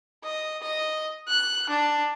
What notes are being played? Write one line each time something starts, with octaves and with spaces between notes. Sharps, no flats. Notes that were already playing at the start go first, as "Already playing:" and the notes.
D#5
D#5
F#6
D4